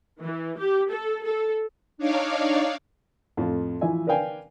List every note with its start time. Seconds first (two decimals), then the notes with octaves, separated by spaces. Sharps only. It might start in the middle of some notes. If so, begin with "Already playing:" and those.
0.21 E3
0.59 G4
0.91 A4
1.24 A4
1.98 D4 D#4 C#5 D5 F5
3.37 F2 A2 F4
3.81 E3 F3 E5 G#5
4.07 A#4 B4 D5 F5 G5 G#5